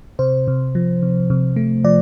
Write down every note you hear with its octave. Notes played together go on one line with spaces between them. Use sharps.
C3 C5
C3
F3
C3
C3
A3
F3 D5